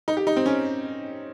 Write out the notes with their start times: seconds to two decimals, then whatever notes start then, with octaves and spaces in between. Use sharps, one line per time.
0.08 D#4
0.17 G4
0.27 D#4
0.36 C4
0.46 C#4